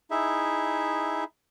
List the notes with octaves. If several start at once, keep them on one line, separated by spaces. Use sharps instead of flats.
D#4 E4 G#4 E5